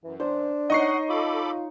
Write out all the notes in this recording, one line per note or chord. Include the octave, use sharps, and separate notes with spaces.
F#2 E3
D4 C5
D#4 C#5 D#5 F#5 C#6 C7
F4 A4 B5 D6